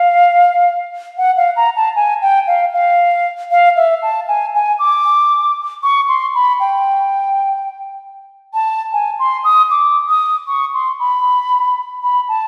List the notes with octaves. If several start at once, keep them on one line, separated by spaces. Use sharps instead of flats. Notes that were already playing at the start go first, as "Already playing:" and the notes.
Already playing: F5
F#5
F5
A#5
A5
G#5
G5
F5
F5
F5
E5
A5
G#5
G#5
D6
C#6
C6
B5
G5
A5
G#5
C6
D#6
D6
D#6
C#6
C6
B5
B5
A5